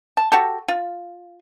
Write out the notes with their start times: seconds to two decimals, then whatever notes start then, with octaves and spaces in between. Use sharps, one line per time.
0.17 A5
0.32 F#4 G4 A4
0.68 F4